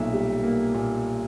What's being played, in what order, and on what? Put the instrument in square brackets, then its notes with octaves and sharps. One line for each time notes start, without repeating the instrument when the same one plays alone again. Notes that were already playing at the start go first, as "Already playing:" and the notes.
Already playing: [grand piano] B1 A#2 E5
G3
A#3
A#2